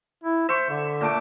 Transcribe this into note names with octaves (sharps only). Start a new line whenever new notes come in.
E4
C5 E5 C#6
D3
A#2 A3 D6